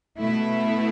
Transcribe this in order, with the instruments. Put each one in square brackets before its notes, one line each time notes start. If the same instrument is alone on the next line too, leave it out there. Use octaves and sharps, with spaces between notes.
[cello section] B2 A3 E4